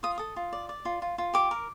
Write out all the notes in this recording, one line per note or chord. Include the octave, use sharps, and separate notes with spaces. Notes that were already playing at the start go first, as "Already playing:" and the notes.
F4 D#6
A4 D#6
F4
D5
D5
F4
F4
F4
G4 D6
A#4